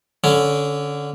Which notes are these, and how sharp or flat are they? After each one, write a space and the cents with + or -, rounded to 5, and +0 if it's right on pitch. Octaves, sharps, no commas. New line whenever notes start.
D3 -15 C#4 +0